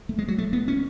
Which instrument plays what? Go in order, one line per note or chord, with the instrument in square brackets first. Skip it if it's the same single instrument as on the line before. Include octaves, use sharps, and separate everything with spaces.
[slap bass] A3
G#3
F#3
A3
B3
C#4